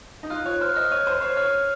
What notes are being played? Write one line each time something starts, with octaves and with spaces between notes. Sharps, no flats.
D#4
F4 F#6
C#5 F#6
C5 F6
D#5 F6
C#5 D#7
C5 D#7
C#5 C7
C#5 F6
F6